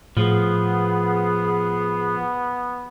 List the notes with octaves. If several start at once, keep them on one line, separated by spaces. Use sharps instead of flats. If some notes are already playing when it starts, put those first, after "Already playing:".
A2 F3 B3 G#4